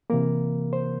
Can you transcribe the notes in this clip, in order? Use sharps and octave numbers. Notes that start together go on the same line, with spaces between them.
C3 E3 A#3 A#4
C5